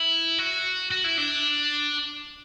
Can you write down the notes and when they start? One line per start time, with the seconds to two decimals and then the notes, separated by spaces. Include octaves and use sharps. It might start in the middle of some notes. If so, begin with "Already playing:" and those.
Already playing: E4
0.39 F#4
0.91 F#4
1.04 E4
1.18 D4